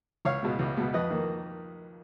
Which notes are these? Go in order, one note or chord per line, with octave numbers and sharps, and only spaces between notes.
C#2 C#5 F5
B2 G#3 B3
C#2
B2 G#3 B3
F2 B4 D#5
D#3 A#3 D#4